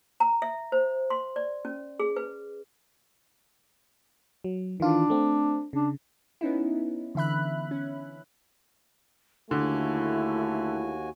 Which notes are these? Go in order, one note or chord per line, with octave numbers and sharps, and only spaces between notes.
A#5
E5
C5
C6
D5
C#4
G#4
B4
F#3
D#3 E3 D4 F4
A3 C4
C#3 D4
B3 C#4 D#4 E4
D3 E3 E5 B5 F#6
C#4
D#2 D3 A3 E4 F#4 G#5